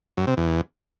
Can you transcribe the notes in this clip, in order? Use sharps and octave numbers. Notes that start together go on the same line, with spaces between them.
F#2
C3
E2